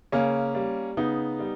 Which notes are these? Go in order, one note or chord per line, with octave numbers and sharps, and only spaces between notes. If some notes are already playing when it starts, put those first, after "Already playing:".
C#3 A#3 C#4
G3
C#3 B3 D#4
G3